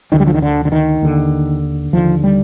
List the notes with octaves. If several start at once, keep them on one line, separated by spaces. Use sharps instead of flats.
D2 D3 D#3
G3
F3
D#3
D3
D3
D#3
D#2 D3
D#2 D3 F3
G3